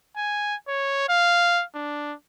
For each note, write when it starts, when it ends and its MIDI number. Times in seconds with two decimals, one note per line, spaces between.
0.16 0.55 80
0.68 1.09 73
1.09 1.63 77
1.75 2.14 62